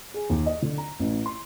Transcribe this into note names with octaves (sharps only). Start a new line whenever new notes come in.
G#4
D#2
D#5
D3
A#5
A1
C6